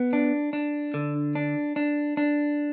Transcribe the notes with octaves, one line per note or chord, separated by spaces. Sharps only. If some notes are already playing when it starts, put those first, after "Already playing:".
Already playing: B3
D4
D4
D3
D4
D4
D4